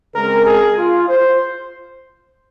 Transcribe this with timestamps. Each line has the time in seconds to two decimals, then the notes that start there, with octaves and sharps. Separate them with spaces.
0.15 C#3 G#3 C4 A#4
0.46 G#4
0.77 F4
1.08 C5